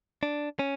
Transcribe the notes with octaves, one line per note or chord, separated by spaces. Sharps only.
D4
C#4